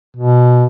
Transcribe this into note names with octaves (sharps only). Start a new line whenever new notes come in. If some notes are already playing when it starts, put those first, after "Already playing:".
B2